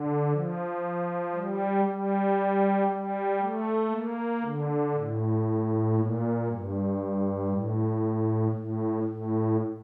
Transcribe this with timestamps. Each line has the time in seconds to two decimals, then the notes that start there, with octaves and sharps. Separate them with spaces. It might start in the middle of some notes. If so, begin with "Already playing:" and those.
Already playing: D3
0.31 F3
1.34 G3
1.85 G3
2.88 G3
3.40 A3
3.90 A#3
4.42 D3
4.93 A2
5.95 A#2
6.46 G2
7.48 A2
8.51 A2
9.03 A2